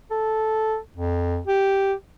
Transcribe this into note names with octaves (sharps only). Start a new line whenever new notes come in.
A4
F2
G4